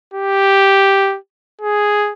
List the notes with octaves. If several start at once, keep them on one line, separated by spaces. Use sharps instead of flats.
G4
G#4